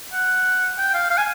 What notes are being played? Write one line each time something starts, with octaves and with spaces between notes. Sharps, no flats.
F#5
G5
F5
F5
G#5